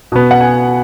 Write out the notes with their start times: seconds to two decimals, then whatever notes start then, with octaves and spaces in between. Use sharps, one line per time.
0.12 B2 B3
0.31 F#5
0.41 G#5